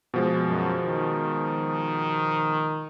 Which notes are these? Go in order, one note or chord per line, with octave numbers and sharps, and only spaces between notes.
B2 F3 G#3
F#2
D#3